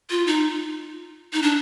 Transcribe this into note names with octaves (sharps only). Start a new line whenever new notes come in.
F4
D#4
D#4
D4